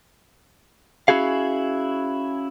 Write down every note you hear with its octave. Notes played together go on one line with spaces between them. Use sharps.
C#4 E4 F#4 G#4 F5